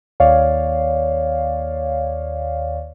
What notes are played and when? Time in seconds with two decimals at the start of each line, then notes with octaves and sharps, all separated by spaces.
0.20 D#2 C#5 D5 F5